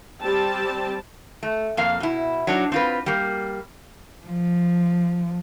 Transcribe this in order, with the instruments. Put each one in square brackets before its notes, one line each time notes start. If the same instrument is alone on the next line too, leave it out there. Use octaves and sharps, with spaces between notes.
[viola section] G3 C4 G4 A5
[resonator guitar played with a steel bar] A3
F2 A#3 F5
B2 E4
F#3 D4 D#4
C4 F4 B4
G3 A#3
[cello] F3